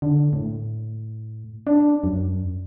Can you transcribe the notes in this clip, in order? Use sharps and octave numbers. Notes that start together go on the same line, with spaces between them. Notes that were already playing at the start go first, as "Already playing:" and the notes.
D3
A2
D4
F#2